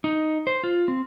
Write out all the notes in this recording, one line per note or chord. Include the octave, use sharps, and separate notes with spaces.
D#4
C5
F4
C4